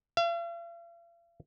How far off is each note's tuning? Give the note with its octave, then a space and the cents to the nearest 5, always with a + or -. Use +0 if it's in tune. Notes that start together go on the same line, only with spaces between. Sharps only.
F5 -45